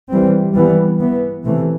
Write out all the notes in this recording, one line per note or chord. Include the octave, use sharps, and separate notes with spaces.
E3 G3 C4
E3 G3 B3
E3 B3
C3 E3 A3